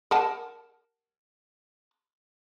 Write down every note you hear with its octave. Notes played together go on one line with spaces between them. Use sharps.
A#4 F#5 A5